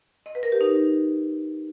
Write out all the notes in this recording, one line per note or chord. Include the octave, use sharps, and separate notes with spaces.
D#5
B4
A#4
G4
D#4